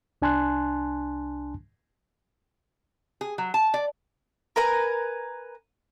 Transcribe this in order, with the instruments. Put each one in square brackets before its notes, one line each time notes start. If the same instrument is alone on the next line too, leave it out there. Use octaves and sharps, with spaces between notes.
[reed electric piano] C2 D4 G#5 A5 C6 F#6
[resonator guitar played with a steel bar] G#4
F#3
A5
D5
[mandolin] A#4 B4 G#5 A#5